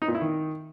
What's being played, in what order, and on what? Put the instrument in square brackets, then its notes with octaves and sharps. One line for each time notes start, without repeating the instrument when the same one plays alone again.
[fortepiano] D#4
A#2
E4
D#3